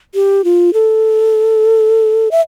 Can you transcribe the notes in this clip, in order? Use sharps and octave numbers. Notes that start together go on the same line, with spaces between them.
G4
F4
A4
E5